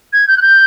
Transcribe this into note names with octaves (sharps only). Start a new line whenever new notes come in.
G#6
G6
F#6
G6